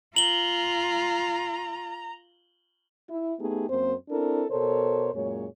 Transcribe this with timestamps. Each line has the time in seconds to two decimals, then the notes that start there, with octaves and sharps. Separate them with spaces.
0.16 F4 A#5 F#7 G7
3.09 E4
3.39 A3 B3 D#4 G4 G#4
3.69 F#2 A#3 C4 C5
4.09 C4 D4 E4 A4 A#4
4.49 B2 A4 A#4 C5 C#5
5.15 F#2 A#2 G#3 C#5